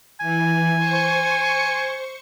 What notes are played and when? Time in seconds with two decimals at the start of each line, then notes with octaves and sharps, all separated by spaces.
0.20 E3 G#5
0.78 C5 C#6 C#7